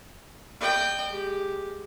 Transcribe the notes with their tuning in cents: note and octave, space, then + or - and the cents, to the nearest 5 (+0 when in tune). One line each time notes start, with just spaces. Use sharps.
D#5 -45 G5 +0
G#3 +0 G4 +0